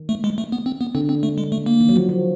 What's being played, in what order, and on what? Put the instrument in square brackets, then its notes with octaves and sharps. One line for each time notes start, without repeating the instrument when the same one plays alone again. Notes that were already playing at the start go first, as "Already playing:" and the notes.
Already playing: [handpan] D#3
[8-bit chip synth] A3
G#3
A3
B3
C4
B3
[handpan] D3 [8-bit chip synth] C4
[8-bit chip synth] C4
A3
G#3
A3
A#3
[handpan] D#3
F#3
F3
F#3